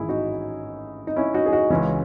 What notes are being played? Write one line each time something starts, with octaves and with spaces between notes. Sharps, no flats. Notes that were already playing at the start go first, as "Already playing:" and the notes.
Already playing: A1 G#2 D#3 E4 G#4
D#4 F#4
D#4
C#4 E4
D#4 F#4
G#4
D#4 F#4
C#2 C#3 E3 C#4 E4